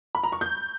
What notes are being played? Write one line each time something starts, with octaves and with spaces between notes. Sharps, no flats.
B5
A#5
C#6
G6